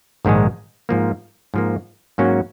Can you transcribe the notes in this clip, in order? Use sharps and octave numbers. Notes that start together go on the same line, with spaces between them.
A#1 G#2 D#3 G#3
G#2 F3 A#3
G#2 F3 A#3
G#2 F#3 A#3 C#4 F#4